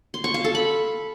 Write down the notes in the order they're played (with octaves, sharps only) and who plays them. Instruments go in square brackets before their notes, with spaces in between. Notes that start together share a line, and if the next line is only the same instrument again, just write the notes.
[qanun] C6
C#6
F5
A4
B5